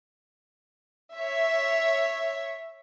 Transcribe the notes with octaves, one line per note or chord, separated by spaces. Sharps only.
C#5 E5